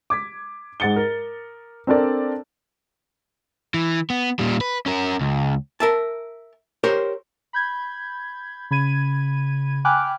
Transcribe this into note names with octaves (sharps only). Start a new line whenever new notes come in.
D6 G#6 B6
G#2 F#5 A6 C#7 G7
A#4
C4 D4 A4 A#4 D5 A5
E3
B3
A#2 G3
B4
C#4 A#4
C#2
A#4 E5 A5
G4 A#4 C5 C#5
B5 G6 G#6
C#3 B5 G#6 D#7
G5 G#5 B5 D6 F6 F#6